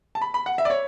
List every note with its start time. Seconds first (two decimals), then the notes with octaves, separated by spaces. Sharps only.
0.15 A5
0.22 B5
0.34 B5
0.46 F#5
0.58 E5
0.65 D5
0.70 C#5